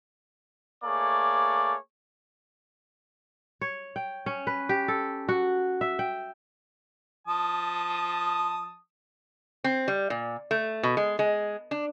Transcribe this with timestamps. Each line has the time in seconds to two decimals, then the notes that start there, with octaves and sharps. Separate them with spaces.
0.84 A3 A#3 G#4 C#5 D5
3.61 C#5
3.96 G5
4.26 C#4
4.47 B4
4.69 G4
4.88 A4
5.29 F#4
5.81 E5
5.99 G5
7.28 F3 A5 D#6
9.64 C4
9.88 G3
10.10 A#2
10.51 A3
10.83 B2
10.97 G#3
11.19 G#3
11.71 D4